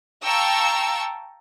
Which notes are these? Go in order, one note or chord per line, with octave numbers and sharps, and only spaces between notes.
F5 G5 A5 A#5 C#6 E6